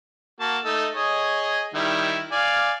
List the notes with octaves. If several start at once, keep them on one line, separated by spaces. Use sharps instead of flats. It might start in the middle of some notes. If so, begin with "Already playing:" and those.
A#3 F#4 A5
A3 D#4 A4
G#4 C#5 D#5
D#3 G3 E4
D5 F5 G#5